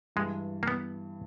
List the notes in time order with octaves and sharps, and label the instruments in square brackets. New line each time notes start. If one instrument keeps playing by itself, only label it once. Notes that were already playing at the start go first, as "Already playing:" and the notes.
[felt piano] G2 E3 G3 [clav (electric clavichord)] G#3
[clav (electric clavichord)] A#3
B3